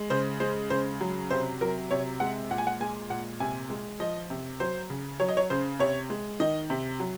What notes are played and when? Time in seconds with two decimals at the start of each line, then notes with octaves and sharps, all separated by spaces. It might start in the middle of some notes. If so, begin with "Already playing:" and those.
Already playing: G#3
0.10 C#3 C5
0.40 G#3 C5
0.70 C#3 C5
1.01 F#3
1.31 C3 C5
1.61 F#3 A#4
1.91 C3 C#5
2.20 G#3 F#5
2.50 A#2 F#5
2.58 G#5
2.67 F#5
2.80 G#3 G#5
3.10 A#2 F#5
3.40 C3 G#5
3.70 G#3
4.00 F3 D#5
4.30 C3
4.60 F#3 C5
4.90 C#3
5.20 F#3 C#5
5.29 D#5
5.37 C#5
5.50 C#3 C5
5.79 C3 C#5
6.10 G#3
6.40 D#3 D#5
6.70 C3
7.00 F#3